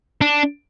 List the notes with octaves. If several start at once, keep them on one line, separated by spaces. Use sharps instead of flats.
D4